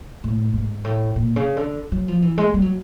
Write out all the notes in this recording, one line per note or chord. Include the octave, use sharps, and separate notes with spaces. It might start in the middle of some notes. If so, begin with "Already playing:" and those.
A2
G#2
A2
A#2
C#3
D3
F#3
F3
E3
G#3
G3
F#3